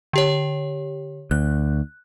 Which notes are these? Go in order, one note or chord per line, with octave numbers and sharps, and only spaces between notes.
D3 G4 C#5
D2 F#6